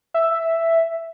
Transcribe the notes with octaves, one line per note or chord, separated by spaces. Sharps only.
E5